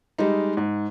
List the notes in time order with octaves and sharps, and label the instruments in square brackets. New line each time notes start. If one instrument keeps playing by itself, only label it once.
[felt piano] G3 G#3 D#4
G#2